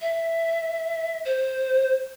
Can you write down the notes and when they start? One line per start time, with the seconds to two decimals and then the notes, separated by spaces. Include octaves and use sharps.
0.01 E5
1.25 C5